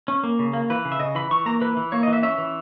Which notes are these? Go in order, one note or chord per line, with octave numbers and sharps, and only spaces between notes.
C#4
A#3
C#3
A#3
E3 B4
C#3
E5
C#3 D#5
E3 B5
E3 C#6
A#3 A#5
E3 B4
E3
A#3 C#5
D#5
E3
E5
C#4 E5
E3